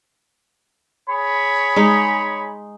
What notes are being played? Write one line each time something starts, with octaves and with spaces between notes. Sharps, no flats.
G#4 C#5 B5
G#3 D#4